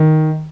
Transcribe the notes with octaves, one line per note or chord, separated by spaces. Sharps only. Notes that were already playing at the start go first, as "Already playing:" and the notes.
Already playing: D#3